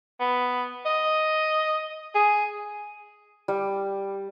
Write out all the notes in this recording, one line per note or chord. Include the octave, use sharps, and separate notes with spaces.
B3
D#5
G#4
G3